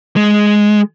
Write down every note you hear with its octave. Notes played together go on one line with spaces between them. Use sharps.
G#3